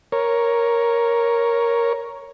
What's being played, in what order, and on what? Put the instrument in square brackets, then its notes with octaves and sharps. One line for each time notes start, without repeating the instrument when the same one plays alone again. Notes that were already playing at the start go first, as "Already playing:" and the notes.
[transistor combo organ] A#4 C#5